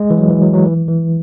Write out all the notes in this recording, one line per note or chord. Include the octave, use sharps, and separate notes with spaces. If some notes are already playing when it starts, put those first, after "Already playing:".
Already playing: G#3
E3
F#3
E3
F#3
F#3
E3
E3